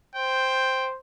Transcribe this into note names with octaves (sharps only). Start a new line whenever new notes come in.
C5 G5